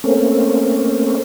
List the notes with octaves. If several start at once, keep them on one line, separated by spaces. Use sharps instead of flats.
A3 A#3 C4 C#4